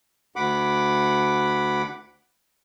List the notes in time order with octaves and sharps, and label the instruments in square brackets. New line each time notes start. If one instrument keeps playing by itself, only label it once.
[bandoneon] D2 F#5 B5 D6